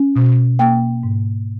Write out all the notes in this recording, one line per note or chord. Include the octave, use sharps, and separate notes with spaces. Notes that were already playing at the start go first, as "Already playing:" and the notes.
Already playing: C#4
B2
A#3 G5
G#2